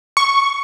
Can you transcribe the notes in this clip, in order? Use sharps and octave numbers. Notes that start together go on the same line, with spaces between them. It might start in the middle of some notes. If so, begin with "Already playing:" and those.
C#6